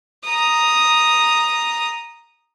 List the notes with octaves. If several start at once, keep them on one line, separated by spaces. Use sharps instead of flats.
A#5 D#6